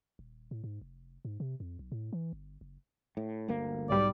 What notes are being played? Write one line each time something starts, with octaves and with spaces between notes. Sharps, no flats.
D#1
A2
G#2
F1
G#2
C3
F2
B1
A2
E3
G1
F#1
A2
G1 D2 A#3
B1 G#2 G3 D5